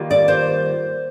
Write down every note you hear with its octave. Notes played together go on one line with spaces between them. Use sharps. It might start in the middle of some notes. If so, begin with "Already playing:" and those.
Already playing: D#3 G3 A#3 F4
D5
C5